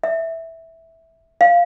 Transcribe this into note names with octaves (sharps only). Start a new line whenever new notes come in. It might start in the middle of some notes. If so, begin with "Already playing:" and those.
E5
F5